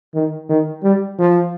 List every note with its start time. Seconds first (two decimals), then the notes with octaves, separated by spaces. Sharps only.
0.14 D#3
0.49 D#3
0.83 G3
1.18 F3